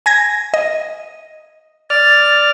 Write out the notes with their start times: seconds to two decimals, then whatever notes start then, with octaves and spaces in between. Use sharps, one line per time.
0.06 G#5 G#6 A#6
0.54 D#5
1.90 D5 F6 A6